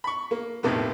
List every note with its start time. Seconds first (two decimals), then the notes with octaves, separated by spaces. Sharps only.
0.04 B5 C#6
0.31 A#3
0.63 B1 F2 A2 C3 A#3 B3